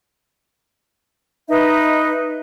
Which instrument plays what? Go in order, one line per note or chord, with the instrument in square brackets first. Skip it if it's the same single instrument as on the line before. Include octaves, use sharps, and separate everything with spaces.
[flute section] D#4 B4 D#5 E5